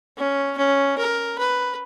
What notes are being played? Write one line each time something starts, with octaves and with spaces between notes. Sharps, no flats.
C#4
C#4
A#4
B4